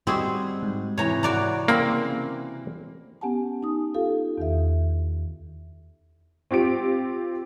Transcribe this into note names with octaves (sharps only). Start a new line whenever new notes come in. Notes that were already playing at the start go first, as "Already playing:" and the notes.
G3 C4 D#4 F#4 G#4
G#2
C3 E3 C#5 G5 A#5
F#4 D5 A#5
C#3 A#3 C4 B5
B3 C#4 G4 F#5 G#5 A5
D#4 D#6
F4 G4 A4 F5
E2 D#3 E5
C4 F4 G4 D7